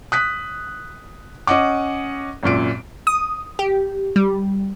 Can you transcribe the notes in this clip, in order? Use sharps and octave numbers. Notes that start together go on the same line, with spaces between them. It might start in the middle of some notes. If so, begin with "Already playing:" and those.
D#6 F#6 B6
C#4 D#5 F#5 D6
G#1 F#2 A#2 D7
D#6
G4
G3